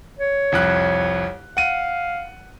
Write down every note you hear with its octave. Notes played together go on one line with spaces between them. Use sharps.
C#5
C2 F2 F#6
F5 F#5 D#7